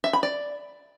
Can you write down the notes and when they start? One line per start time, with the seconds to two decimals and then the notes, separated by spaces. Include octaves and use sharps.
0.04 E5
0.13 B5
0.23 D5